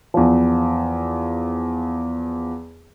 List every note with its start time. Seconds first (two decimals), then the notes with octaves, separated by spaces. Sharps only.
0.14 E2 F3